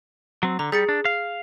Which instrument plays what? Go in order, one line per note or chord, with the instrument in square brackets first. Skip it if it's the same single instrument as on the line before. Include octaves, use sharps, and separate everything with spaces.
[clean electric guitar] F#3 C4
[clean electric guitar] D3 [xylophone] A#5
[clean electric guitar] G3 [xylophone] G#4 A6 C#7
[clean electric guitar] D4
F5